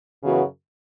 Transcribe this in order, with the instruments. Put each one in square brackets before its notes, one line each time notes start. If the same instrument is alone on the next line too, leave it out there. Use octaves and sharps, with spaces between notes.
[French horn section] F#2 C#3 E3 B3 F#4